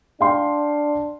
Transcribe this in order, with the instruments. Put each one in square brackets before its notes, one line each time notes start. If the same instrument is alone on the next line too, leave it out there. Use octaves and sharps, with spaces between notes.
[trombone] D4 [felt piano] F5 G5 C6